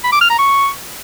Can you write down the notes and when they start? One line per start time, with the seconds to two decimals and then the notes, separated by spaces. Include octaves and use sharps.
0.04 B5
0.12 D6
0.21 F6
0.30 A#5
0.39 C#6